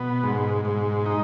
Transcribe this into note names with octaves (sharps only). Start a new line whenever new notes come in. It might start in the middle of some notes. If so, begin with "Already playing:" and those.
Already playing: B2 B3
G#2
G#2
D#4